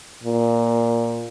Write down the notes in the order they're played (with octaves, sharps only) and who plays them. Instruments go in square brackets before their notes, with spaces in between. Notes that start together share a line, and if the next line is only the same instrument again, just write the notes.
[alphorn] A#2